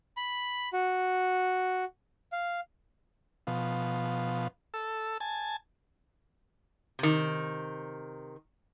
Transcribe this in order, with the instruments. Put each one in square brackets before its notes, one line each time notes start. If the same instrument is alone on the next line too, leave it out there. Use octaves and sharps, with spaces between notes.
[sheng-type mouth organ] B5
F#4
F5
[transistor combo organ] B2 F3
A4 E6
G#5 A5
[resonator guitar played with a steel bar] C3 D#3